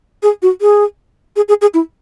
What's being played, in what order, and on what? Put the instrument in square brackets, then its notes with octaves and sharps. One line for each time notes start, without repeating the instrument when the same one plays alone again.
[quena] G#4
F#4
G#4
G#4
G#4
G#4
E4